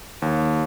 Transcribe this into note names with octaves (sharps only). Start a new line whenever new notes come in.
D#2